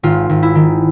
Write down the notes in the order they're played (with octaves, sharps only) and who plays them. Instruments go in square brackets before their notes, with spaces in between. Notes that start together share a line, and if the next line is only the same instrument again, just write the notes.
[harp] G#1 F4
G#1
E4
D#3